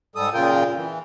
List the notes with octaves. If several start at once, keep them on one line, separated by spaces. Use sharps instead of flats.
G#2 G3 A4 D#6
F#2 A#2 C#3 F4 A#4 G5
E3